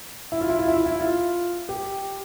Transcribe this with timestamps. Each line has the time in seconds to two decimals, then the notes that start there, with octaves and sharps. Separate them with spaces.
0.32 E4
0.41 F4
0.50 E4
0.59 F4
0.68 E4
0.77 F4
0.86 E4
1.01 F4
1.69 G4